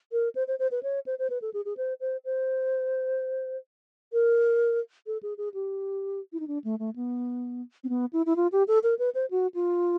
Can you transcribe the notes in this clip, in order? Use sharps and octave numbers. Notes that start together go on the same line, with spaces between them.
A#4
C5
C5
C5
B4
C#5
C5
C5
B4
A4
G#4
G#4
C5
C5
C5
A#4
A4
G#4
G#4
G4
E4
D#4
D4
A3
A3
B3
C4
B3
E4
E4
F4
G4
A4
A#4
B4
C5
F#4
F4